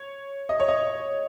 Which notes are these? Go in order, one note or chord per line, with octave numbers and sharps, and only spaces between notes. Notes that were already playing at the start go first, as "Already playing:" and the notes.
Already playing: C#5
D#5
C#5
D#5